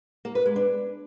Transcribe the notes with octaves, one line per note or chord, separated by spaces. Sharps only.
A#3
B4
G#3
D4